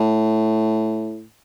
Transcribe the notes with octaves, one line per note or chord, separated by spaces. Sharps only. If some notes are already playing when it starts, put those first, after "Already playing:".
Already playing: A2